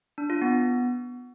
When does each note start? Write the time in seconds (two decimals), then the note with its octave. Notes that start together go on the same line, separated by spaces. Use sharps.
0.18 D4
0.30 F4
0.42 B3